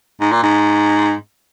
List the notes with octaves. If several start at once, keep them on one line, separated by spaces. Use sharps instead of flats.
G#2
A#2
G#2